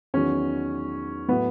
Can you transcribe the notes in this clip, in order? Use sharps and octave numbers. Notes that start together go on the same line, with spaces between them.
E2 D#3 F#3 C#4
A2 F#3 B3